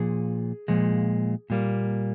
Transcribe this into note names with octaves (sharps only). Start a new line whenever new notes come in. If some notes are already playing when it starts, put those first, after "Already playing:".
Already playing: A#2 F3 G#4
A#2 F3 G#3
A#2 G3 A#3